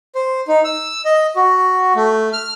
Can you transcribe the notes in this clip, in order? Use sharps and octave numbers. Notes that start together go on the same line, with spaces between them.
C5
D#4
E6
D#5
F#4
A3
F6